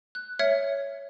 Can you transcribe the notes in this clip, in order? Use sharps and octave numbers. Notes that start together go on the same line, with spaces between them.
F#6
C#5 E5 F6 G#6 C#7